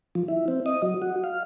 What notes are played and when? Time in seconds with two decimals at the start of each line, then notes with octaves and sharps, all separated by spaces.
0.15 F3
0.28 E4
0.48 C4
0.66 D#5
0.82 F#3
1.02 F#4
1.24 F5